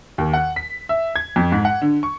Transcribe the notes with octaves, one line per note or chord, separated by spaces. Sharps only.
D#2
F#5
B6
E5
G#6
F2
G#2
F#5
D3
C#6